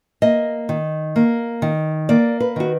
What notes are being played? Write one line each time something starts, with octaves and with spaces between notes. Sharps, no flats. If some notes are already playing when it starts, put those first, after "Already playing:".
A#3 D#5
D#3
A#3
D#3
A#3 D5
B4
D#3 F#4